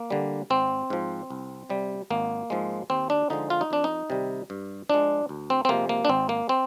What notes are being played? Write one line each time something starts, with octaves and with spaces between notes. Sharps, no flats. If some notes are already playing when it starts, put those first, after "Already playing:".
Already playing: A#3
D3 G3
G#1 C4
G#2 F3
C2
C3 G3
G#1 A#3
G#2 F3 G#3
D#2 C4
D4
D3 F3 G#3 D#4
F4
D#4
F2 D4
D#4
C3 D#3 G3
G2
F3 G#3 D4
D2
C4
C4
C3 F3 G#3 A#3
A#3
D4
G#1 C4
A#3
C4